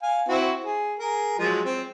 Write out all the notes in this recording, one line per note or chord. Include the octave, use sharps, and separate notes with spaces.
F5 G#5
C4 E4 F#4
G#4
G#4 A#4
F3 F#3 G#3
C4